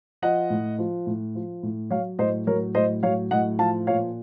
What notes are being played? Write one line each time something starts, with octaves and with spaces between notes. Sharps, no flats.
F3 D#5 F#5
A2
F3
A2
F3
A2
F#3 C#5 F5
A2 C5 D#5
F#3 A#4 C#5
A2 C5 D#5
F#3 C#5 F5
A2 D#5 F#5
F3 F5 A5
A#2 C#5 F5